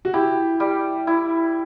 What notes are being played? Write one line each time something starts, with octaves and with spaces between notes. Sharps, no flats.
F#4
E4 G4
G3
E4